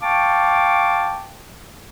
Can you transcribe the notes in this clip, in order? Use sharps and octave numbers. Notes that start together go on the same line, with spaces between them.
F5 G5 A5 C#6 D6